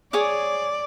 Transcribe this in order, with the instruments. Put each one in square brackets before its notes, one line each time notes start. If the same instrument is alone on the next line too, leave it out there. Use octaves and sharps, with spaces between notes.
[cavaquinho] G#4 C#5 D6 [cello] D5